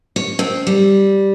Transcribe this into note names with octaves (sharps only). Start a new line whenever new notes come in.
C#5
C4
G3